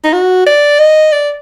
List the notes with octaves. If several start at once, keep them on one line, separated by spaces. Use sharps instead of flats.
D#4
F#4
D5
D#5
D5